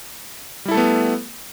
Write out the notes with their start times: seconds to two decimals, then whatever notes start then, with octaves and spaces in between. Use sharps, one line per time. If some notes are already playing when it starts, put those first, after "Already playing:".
0.65 G3
0.68 E4
0.71 A4
0.74 A3
0.77 B3